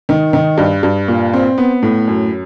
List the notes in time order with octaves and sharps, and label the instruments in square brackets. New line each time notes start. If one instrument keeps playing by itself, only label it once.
[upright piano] D#3
D#3
G2
G2
A#2
C4
B3
A2
F#2